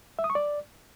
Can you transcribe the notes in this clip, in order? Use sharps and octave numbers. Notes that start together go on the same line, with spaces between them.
E5
D#6
C#6
D5